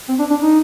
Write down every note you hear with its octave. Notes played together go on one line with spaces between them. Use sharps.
C4
D4
D4
D#4